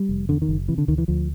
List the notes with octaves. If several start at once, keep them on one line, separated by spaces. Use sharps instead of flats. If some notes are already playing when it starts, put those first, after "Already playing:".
Already playing: G3
F1
E2 D3
D#3
F#1
C3 E3
D3
D2 D#3
E3
D2 F3